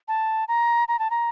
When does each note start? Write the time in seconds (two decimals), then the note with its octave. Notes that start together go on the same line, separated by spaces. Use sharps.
0.08 A5
0.48 A#5
0.88 A#5
0.99 A5
1.11 A#5